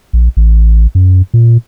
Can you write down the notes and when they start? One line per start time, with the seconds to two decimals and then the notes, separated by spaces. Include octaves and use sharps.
0.13 A#1
0.37 A1
0.95 F#2
1.34 A#2